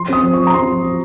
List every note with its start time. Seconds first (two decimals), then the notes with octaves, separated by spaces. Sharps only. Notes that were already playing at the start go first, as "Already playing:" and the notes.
Already playing: F3 C6
0.08 C4 D#6
0.23 F3
0.34 F3 C#6
0.47 A#5
0.54 C4 C6
0.68 F3
0.83 F3